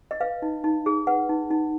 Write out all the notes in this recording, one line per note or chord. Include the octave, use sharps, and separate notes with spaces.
D#5
B4 F5
D#4
D#4
G#4
B4 F#5
D#4
D#4